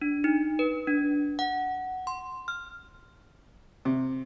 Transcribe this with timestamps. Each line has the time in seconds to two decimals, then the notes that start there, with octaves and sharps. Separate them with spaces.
0.02 D4
0.24 D#4
0.59 B4
0.87 D4
1.39 F#5
2.07 C6
2.48 F6
3.85 C3